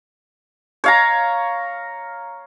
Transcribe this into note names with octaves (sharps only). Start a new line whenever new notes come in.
C#5 F5 A#5